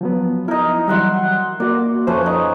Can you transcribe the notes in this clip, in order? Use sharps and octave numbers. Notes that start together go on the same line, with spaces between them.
F3 F#3 B3
D#4 E4 A#4
E3 F#3 G3 E5 F#5 C6
A#3 F#4 D5
F2 F3 A3 C#4 B4 C5
D#4